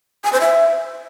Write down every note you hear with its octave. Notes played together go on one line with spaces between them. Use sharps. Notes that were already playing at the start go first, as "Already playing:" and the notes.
G#5
C5
E5